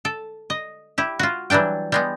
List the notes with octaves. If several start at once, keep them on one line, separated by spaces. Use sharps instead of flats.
A4
D#5
E4 G4
F4 F#4
E3 F#3 G3 D4 G5
G3 G#3 B3